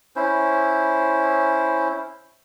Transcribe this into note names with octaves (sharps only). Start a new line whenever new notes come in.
C#4 E4 C5